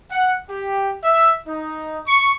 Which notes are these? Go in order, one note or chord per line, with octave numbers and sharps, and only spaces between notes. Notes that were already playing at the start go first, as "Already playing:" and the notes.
F#5
G4
E5
D#4
C#6